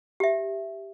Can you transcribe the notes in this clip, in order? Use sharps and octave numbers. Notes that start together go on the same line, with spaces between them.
G4 E5